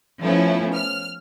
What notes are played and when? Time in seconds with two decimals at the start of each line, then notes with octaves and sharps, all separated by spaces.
0.22 F3 A3 B3 C#4 E4
0.74 F6